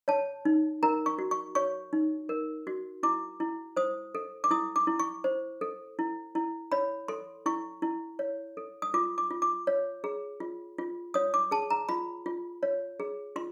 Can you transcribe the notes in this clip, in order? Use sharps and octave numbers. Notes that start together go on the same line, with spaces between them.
C#5 A5
D#4
A#4 A#5
C#6
F#4
C#6
C#5 C#6
D#4
A#4
F#4
E4 D6
E4
C5 D#6
A4
D6
E4 D#6
D6
E4
C#6
C5
A4
E4
E4
C#5 B5
A4 C6
E4 C#6
E4
C#5
A4
D#6
F4 D6
D6
F4
D6
C#5
G#4
F4
F4
C#5 D#6
D6
G#4 A5
A#5
F4 B5
F4
C#5
G#4
F4 C6